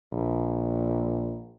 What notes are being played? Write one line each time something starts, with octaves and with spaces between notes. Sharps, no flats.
A#1